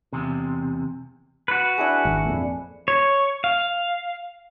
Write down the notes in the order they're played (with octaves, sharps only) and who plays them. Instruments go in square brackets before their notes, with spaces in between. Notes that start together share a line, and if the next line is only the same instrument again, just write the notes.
[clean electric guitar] E2 C3
[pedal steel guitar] F#4 B4
[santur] D4 E4 G#4
[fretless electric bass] G#1
F2 A#2
[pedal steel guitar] C#5
F5